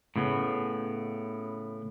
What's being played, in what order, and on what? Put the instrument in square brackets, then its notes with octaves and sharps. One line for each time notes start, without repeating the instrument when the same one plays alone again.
[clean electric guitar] A2 C#3 B3